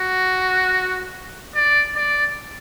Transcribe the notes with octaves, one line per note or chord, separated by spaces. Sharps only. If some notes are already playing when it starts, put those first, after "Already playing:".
Already playing: F#4
D5
D5